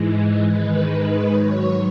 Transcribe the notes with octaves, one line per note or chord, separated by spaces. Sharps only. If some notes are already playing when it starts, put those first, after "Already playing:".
Already playing: G#2 E3 G#3
G#2 D#3 G#3 B4
B4
G#2 F#3 C#5